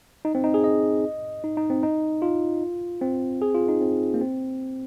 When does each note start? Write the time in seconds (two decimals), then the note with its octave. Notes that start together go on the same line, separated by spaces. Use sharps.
0.25 D#4
0.35 C4
0.44 D#4
0.54 G#4
0.64 D#5
1.44 D#4
1.57 D#4
1.70 C4
1.83 D#4
2.22 F4
3.01 C4
3.42 G#4
3.55 F4
3.68 D#4
3.81 C4
4.14 A#3
4.21 C4